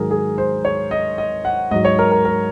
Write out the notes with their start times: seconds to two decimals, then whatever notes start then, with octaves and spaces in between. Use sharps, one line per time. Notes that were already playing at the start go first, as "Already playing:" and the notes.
Already playing: G#2 D#3 F#3 G#4 A#4
0.11 G#4
0.38 C5
0.65 C#5
0.91 D#5
1.18 D#5
1.45 F#5
1.71 G#2 F#3 D#5
1.85 C#5
1.99 A#4
2.12 A#4
2.25 A#4